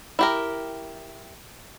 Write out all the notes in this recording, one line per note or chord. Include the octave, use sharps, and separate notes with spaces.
E4 G4 A#4